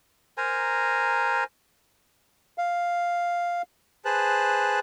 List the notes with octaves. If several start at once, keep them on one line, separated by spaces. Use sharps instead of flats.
A#4 C5 G#5 A#5
F5
G#4 B4 C5 A5 F#6